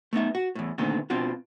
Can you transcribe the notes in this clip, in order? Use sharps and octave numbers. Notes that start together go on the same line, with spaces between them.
A3 B3 D#4 E5
F#4
E2 A2
A#2 D3 D#3 A3 B3 C4
B2 C4 D4 F4 F#4